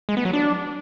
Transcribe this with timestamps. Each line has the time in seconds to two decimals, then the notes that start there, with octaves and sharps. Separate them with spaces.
0.09 G#3
0.17 B3
0.25 F#3
0.33 D4